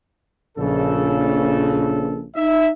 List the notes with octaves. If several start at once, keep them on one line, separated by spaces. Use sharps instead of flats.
A#1 C#3 A4
D#4 E5